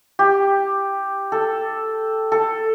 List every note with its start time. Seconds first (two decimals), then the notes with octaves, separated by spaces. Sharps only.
0.19 G4
1.32 A4
2.32 A4